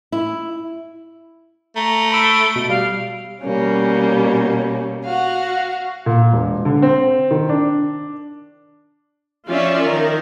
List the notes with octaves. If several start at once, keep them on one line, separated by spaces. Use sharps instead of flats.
E4
A3 A#5
B5 E6 D7
B2
G3 F5
B2 G3 A#3 C#4
F#4 F5
A#2
E1
D3
C4
D#3
D4
F3 C#4 F4 C#5 D5 E5
D#3 A#4